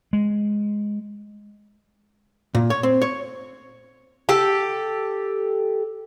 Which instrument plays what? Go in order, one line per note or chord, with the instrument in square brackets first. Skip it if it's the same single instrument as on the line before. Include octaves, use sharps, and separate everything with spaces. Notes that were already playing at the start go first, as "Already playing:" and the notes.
[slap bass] G#3
[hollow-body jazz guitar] A#2
C#5
C4
C#5
[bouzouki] G4 A4